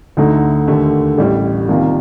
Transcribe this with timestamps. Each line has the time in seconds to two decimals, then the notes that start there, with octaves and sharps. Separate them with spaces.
0.17 D2 D3 A3 D#4
0.68 D#2 D3 A3
1.18 A1 A2 G3
1.69 C2 C3 D#3 A#3 F4